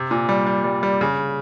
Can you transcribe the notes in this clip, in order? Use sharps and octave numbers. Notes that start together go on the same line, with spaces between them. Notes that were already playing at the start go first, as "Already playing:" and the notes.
Already playing: C3
A#2
G3
G3
G3
G3
C#3